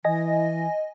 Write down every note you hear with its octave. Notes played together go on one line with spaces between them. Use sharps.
E3 D#5 G#5 A#6